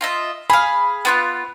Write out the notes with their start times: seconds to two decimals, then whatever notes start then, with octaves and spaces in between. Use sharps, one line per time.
0.01 F4 D#5 E5
0.50 G#4 F5 B5
1.05 B3 F4 F#6